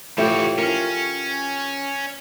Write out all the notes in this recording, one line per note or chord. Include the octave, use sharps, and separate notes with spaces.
A2 E3 F3 F#4 G4
C#4 F4 A#4